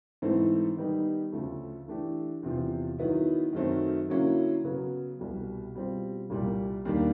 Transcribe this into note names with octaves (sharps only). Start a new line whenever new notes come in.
G#2 E3 A3 C4 E4
D#3 G3 B3 D#4
D2 C#3 F3 A3
E3 A3 D4 G4
E2 C3 F3
D#3 F#3 B3 E4
F#2 D#3 F#3 A3 C4
D3 F#3 A#3 C#4 E4
C#3 F#3 B3
C2 B2 G3
B2 G3 C4 F4
C2 A#2 G3 A#3
D#2 D#3 G3 A#3 D4